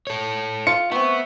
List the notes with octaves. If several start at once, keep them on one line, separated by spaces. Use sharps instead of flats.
A4 C#5
F4 C#7
A3 B3 C4 C#6